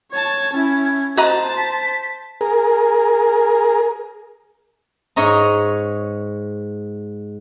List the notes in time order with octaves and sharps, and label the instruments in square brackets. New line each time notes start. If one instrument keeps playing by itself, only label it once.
[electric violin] C#5 A5 [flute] G#6
[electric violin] C#4 E4
[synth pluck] F#4 D#5 A#5 [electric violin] C5 A5
[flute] B6
[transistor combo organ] G#4 A#4
[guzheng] G#2 C#5 D#5 A#5